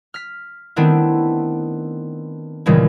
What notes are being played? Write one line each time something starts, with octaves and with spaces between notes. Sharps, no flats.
F6 B6
D#3 A3 B3 C4 D4 E4
D#2 A#2 C#3 E3 G3 G#3